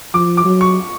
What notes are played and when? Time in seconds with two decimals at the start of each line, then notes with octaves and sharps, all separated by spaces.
0.14 F3 D6
0.37 D6
0.45 F#3
0.61 C#6